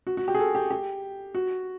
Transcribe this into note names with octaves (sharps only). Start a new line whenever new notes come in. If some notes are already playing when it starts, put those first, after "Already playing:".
F#4
F#4
G4
G#4
A4
G4
G4
F#4